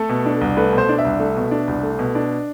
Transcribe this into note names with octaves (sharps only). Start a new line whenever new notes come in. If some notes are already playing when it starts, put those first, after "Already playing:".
Already playing: A3 A4
B2
D4
C2
A3 B4
B2
C5
D4
E5
C2
A3
B2
D4
C2
A3
B2
D4